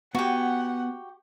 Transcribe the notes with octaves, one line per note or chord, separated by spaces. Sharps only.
B3 F#4 G4 F#5 G#5